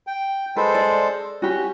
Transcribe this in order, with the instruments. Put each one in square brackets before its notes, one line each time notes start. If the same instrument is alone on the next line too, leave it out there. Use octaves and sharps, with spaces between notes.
[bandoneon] G5
[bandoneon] G#3 A4 C5 [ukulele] B4
[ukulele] D5
[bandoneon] C#4 [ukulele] F#4 G4